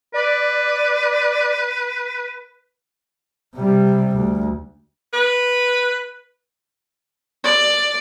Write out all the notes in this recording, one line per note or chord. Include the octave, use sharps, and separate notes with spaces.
B4 D5
C3 G3
D2
B4
D5